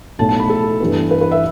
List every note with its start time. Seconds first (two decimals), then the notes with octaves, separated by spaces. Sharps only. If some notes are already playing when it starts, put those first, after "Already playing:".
0.19 B1 A2 A3 A5
0.29 A5
0.40 B5
0.50 A4
0.80 G2 E3 B3
1.11 B4
1.21 B4
1.31 E5